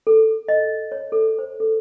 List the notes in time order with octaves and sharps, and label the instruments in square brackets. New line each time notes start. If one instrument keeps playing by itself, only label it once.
[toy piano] A4
D#5
C#5
A4
C5
A4